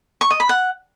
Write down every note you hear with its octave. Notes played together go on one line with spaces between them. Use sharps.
C#6
D#5
B5
F#5